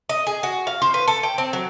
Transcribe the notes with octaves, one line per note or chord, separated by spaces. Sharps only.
D#5
G#4
F#4
F5
C5
B4
A4
G5
C4
F#3